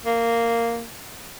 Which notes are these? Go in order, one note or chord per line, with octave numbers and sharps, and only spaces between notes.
A#3